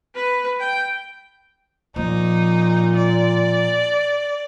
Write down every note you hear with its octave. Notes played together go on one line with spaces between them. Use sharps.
B4
G5
A#2 F3 A#3 D#4
D5